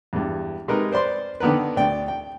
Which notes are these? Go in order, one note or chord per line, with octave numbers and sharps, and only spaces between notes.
E2 G2
C3 G#3 D#4 A#4 B4
B4 C5 D5 C6
D3 D#3 B3 A#4 B4
D2 D5 G5
G5